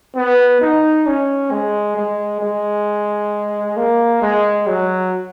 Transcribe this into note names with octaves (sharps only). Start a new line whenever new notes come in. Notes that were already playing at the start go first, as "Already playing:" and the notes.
B3
D#4
C#4
G#3
G#3
G#3
A#3
G#3
F#3